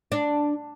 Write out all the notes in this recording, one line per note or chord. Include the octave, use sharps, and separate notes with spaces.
D4